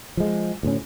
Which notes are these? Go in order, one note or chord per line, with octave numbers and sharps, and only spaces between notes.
F3 G#3
D2 A2 C#4